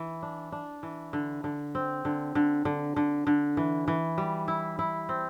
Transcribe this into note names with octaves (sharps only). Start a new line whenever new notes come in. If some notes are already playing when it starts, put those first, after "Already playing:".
Already playing: E3
D4
D4
E3
D3
D3
C4
D3
D3
D3
D3
D3
E3
E3
G3
E4
E4
C4